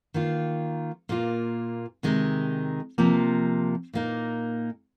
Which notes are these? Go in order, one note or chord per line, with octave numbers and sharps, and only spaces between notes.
D#3 A#3 F4
A#2 A#3 F4
C3 D#3 G#3 D#4
C3 F3 A#3
A#2 A#3 D#4